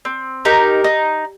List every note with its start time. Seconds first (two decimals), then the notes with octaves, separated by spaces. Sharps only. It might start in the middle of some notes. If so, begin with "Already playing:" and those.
0.05 C4
0.45 D#4 G4 A#4
0.84 D#4